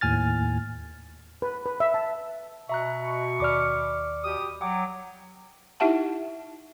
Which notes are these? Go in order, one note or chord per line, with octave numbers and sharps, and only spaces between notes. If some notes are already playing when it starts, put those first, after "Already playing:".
D#2 A2 G#5 F6 A6
B4
B4
E5
A5
B2 E5 A#5 C#6 F#6
D#2 D5 D6 F6 C#7
B2 G4 D#6
F#3 F#5 G5 D6
D#4 E4 G4 E5 F#5 A5